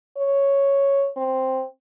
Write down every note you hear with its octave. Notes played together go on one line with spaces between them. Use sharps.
C#5
C4